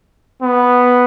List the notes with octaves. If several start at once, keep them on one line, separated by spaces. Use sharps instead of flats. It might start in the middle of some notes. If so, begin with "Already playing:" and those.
B3